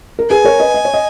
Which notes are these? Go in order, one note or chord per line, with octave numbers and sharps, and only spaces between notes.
A#4
G#4 B4 G#5
A#4 C#5
B4 D#5
D#5
C#5
D#5